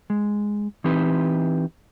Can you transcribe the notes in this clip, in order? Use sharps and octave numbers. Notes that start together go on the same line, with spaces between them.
G#3
E3 C4 D#4 G4 B4